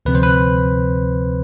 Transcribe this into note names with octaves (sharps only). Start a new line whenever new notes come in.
D2 C3 F3 C4 B4
C5
B4